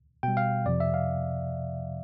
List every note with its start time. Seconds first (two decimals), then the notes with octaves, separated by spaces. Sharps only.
0.23 B2 G3 G5
0.37 F5
0.65 F2 C3 F3 D5
0.80 E5
0.94 F5